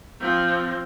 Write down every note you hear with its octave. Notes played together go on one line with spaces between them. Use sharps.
F3 C4